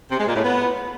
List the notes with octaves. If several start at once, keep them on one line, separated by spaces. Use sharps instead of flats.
C3
G#3
A#2
A2
B3